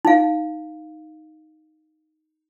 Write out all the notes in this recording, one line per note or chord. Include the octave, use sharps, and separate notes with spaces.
D#4 F5